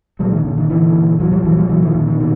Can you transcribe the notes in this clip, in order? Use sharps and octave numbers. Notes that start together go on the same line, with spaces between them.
A#2 F#3 G#3
D#3
A#2 D3
D#3
A#2 D3 E3
A#2
A#2 E3 F#3
F3 G3
A#2 E3 F#3
F3 G3
A#2 E3 F#3
D#3 F3
A#2 D#3
D#3
B2 D#3